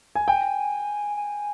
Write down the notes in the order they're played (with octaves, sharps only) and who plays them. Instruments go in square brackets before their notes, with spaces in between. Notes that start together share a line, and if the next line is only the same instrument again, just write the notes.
[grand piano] G#5
[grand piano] G5 [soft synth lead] G#5
[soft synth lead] G#5